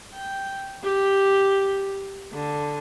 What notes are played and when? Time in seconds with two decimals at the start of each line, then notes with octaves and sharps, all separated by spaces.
0.15 G5
0.83 G4
2.33 D3